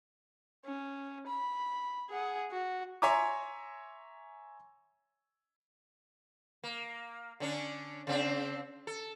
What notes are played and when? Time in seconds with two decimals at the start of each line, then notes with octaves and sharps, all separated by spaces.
0.65 C#4
1.27 B5
2.10 G#4 F#5
2.50 F#4
3.02 C#5 E5 G#5 A#5 C6 D6
6.64 A#3
7.40 D3 C#4 D4
8.07 C#3 C4 D4
8.87 A4